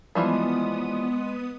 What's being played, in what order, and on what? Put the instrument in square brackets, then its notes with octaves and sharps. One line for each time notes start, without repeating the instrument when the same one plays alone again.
[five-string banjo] E3 F3 G3 [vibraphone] G#3 D#5 C6 [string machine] B3 D#6